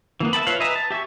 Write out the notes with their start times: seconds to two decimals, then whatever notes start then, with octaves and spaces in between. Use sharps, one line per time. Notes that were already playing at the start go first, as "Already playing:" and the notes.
0.20 E3 A#3 B3
0.33 E5 G5 A5 B5
0.47 F4 B4 C#5 E5 F5
0.60 B4 D#5 E5 G#5 A#5
0.76 A5
0.90 G4 E5 G#5 C#6